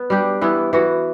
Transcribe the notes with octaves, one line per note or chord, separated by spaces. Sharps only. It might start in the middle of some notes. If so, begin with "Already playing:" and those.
Already playing: B3
G3 D4 G4
E3 B3 E4
E3 B3 F#4